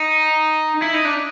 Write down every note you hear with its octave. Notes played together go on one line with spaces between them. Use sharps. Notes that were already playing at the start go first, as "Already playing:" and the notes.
Already playing: D#4
E4
D#4
D4